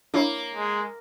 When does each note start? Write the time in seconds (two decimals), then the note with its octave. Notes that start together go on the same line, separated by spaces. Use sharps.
0.14 A#3 D4 E4 C#5
0.55 G#3